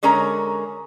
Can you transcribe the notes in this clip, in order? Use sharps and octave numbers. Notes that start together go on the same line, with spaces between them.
D3 G#3 C#4 A#4 C#5 A#5